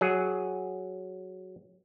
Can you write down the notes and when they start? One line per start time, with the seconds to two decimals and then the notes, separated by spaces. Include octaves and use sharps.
0.01 F#3 G#4